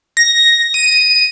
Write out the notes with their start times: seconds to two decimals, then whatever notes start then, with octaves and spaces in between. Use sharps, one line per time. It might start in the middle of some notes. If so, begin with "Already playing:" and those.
0.17 A#6
0.74 D#7